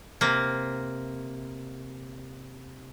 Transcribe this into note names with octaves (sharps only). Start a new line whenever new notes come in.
C3 A#3